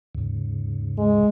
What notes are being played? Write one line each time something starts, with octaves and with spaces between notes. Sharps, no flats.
D#2 G#2 C#3
G#3